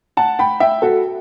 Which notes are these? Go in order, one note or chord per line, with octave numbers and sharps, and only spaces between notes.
F#5 A5
G5 B5
E5 G5
F#4 A4